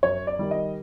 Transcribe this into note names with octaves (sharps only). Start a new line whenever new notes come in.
F#2 C#5
D5
D#3 G3
D#5